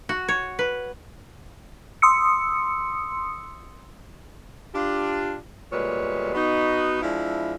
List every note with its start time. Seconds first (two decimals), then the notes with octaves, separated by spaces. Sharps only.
0.09 F#4
0.28 C#5
0.59 B4
2.02 C6 D#6 E6 C#7
4.74 D4 F4 G4
5.72 D2 A#2 G3 G#3 B4 C#5
6.35 B3 D#4 F#4
7.02 F3 G#3 D4 E4